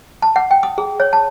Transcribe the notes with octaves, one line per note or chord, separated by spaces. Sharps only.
A5
F#5
G5
D#6
G#4
C#5
A5